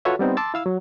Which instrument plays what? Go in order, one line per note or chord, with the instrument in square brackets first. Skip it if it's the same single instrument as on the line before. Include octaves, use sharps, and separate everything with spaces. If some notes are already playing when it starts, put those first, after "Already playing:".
[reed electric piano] F4 F#4 A4 B4 C#5 E5
G3 B3 C4 D#4
A5 C6 D6 E6 A6
E4 F5 E6
F#3